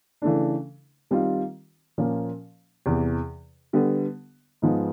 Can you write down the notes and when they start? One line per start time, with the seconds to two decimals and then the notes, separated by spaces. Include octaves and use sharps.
0.22 C#3 E3 A3 D4
1.11 D#3 G3 C4 F4
1.98 A#2 F3 A#3 C#4
2.86 E2 C3 E3
3.73 D3 G3 B3
4.62 G#2 F3 G#3 B3